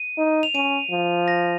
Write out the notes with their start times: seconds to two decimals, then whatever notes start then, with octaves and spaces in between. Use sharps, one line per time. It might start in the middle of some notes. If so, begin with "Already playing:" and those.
Already playing: D#7
0.18 D#4
0.43 F7
0.55 C#4 D#7
0.91 F3
1.28 A#6